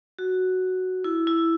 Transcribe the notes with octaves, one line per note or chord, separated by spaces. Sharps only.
F#4
E4
E4